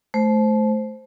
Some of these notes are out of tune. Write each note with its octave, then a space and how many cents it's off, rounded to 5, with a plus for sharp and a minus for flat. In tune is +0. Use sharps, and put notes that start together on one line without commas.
A3 -30 C5 +0